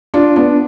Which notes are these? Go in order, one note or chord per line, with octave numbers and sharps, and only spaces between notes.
D4 F4
B3 D4